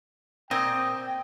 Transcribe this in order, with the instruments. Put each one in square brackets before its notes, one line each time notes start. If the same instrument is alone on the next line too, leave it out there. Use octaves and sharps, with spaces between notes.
[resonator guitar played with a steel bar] A#2 C4 [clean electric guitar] D#5 [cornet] G5